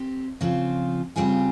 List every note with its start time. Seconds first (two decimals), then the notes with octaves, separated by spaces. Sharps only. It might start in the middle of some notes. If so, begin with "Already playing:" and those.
Already playing: C4 G4
0.41 C#3 F3 C4 F4
1.16 C#3 G3 C4 F4 G#4